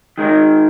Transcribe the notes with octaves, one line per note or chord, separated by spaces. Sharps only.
D#3 G#3 D#4 A#4